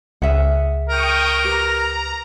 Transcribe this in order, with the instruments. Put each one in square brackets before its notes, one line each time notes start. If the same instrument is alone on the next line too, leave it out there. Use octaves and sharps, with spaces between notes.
[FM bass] C#2 [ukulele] G#4 E5 F#5
[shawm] A#4 [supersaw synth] G5 C#6 D#6
[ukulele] G4 B4 [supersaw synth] A#5